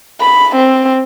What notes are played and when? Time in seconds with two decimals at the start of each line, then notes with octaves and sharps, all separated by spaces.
0.21 B5
0.56 C4